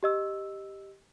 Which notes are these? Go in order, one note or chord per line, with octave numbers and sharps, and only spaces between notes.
G4 D#5 E6